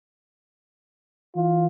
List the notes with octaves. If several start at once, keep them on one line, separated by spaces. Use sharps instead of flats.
E3 F4